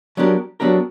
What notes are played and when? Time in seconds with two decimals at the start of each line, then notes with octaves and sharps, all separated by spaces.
0.17 F#3 B3 D4 G4 A#4
0.60 F#3 B3 D4 G4 A#4